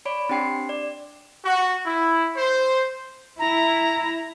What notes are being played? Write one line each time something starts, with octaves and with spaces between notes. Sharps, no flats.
C#5 D5 B5 D7
C4 D4 G4 G5 C6 C7
D5
F#4
E4
C5
E4 A#5